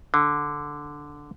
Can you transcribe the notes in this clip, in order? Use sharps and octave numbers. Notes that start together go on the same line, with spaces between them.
D3